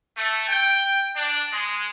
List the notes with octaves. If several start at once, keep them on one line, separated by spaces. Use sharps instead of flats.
A3
G5
D4
G#3